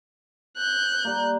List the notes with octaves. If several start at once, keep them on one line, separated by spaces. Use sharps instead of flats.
F#6 G6
G3 A#3